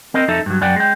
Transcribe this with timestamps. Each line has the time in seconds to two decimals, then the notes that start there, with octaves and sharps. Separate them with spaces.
0.14 C4 A#4 D#5
0.28 F2 D#4 A4 E5
0.46 G2 F#3
0.61 F#2 D5 F#5 G5
0.76 G#3 G5